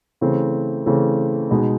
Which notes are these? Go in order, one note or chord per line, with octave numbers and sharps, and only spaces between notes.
C#3 E3 A3 C4
C#3 E3 A3 C4
B2 G#3 B3 D#4